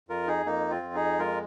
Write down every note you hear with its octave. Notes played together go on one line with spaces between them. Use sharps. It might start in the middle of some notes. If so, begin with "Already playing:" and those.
F2 F4 A#4
D#4 G#4
F2 A#3 D#4
C4 F4
F2
D#4 G#4
G#3 F4 A#4